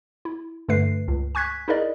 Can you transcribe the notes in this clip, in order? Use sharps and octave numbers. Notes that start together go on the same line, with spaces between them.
E4
G2 D3 A3 B4 C7
C#2
G#5 C#6 F#6 G#6 B6
D#4 E4 G#4 A#4 D5 D#5